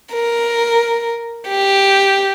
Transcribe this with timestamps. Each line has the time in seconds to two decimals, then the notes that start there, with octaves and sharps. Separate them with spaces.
0.14 A#4
1.48 G4